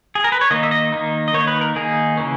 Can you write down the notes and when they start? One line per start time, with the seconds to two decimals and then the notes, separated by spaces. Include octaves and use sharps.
0.15 G#4
0.24 A#4
0.32 B4
0.41 C#5
0.51 D#3 A#3 D#4 D#5
0.63 E5
0.71 D#5
0.92 D#3 A#3 D#4
1.28 D#5
1.34 D#3 A#3 D#4 C#5
1.47 B4
1.61 A#4
1.75 D#3 A#3 D#4 G#4
2.17 C#3 E3 A#3 C#4